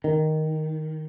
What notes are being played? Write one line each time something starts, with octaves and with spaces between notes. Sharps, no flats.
D#3